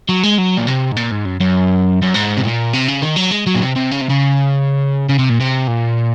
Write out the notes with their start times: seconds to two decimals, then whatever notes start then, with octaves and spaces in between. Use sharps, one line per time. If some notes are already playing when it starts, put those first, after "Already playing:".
0.09 F#3
0.23 G#3
0.38 F#3
0.58 A#2
0.68 C3
0.92 G#2
0.97 A#2
1.11 G#2
1.25 F#2
1.40 F#2
2.02 F#2
2.15 G#2
2.37 C3
2.44 A#2
2.73 C3
2.88 C#3
3.02 D#3
3.17 F#3
3.31 G#3
3.47 F#3
3.55 A#2
3.62 C3
3.76 C3
3.91 C#3
4.01 C3
4.09 C#3
5.09 C#3
5.19 C3
5.30 A#2
5.41 C3
5.68 A#2